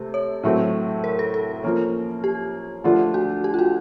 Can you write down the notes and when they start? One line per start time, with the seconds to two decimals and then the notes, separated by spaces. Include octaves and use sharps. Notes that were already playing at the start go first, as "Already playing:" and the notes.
Already playing: C3 A3
0.14 C#5
0.43 A2 F#3 A3 C4
1.04 A#4
1.19 A4
1.34 A4
1.63 F3 A#3 C#4
2.24 G4
2.84 D3 F3 A3 D4 F4
3.14 F#4
3.44 G4
3.54 F4
3.59 F#4